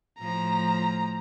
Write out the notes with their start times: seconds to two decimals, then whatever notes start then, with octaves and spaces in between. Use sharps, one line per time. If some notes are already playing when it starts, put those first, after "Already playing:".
0.20 A2 F3 A#5